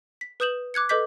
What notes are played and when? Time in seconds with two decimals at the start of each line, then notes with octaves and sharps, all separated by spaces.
0.21 B6
0.40 B4 D#6 G6 E7 F#7
0.74 D6 F#6 G#6 C#7
0.89 A4 B4 D#5 D6 G6 B6